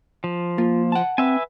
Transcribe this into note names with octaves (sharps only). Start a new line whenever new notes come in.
F3
A#3 F4
F#5 A5
C4 B4 E5 G#5